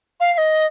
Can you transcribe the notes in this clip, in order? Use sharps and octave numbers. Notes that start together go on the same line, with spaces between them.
F5
F5
D#5